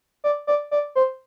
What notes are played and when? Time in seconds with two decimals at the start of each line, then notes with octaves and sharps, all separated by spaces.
0.24 D5
0.47 D5
0.71 D5
0.95 C5